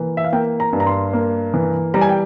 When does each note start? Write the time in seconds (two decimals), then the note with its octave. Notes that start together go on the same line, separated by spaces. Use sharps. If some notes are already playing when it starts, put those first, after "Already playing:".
Already playing: E3 A#3
0.17 E5
0.24 F5
0.33 A#3 G5
0.60 A#5
0.73 G2
0.80 A#5
0.87 C6
1.13 A#3
1.54 E3
1.94 G3 A#5
2.01 G#5
2.09 G5